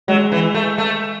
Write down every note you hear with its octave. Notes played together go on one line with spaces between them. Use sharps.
F#3 G#3
E3
A3
A3